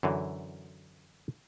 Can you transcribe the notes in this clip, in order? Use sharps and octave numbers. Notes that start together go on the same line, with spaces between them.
F#2 D3 E3